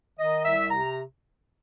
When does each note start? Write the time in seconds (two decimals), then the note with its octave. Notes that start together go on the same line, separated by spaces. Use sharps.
0.18 D#3 D#5
0.44 C2 E5
0.69 C3 A#5